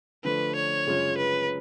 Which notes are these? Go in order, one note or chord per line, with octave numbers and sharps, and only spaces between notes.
D3 F3 A3 D4 B4
C#5
F#2 C#3 G#3 C#4 F4
B4